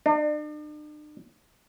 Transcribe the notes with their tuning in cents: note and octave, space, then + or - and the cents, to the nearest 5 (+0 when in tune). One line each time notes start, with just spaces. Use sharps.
D4 +45